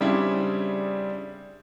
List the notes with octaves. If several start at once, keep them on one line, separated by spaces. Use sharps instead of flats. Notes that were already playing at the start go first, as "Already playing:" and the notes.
C#3 G3 C4 D4 E4 G#4